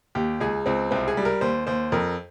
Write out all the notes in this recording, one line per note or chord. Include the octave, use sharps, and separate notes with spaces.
D#2 G4
C#2 G#4
C#2 C4
C2 C4
G#4
G3
A#4
D#2 C5
D#2 C5
F2 A#4